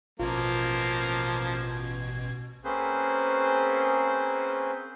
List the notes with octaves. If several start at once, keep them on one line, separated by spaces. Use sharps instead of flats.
A1 B2 F3 A#3 F4 G#6
A#3 C4 C#4 G#4 B4 C5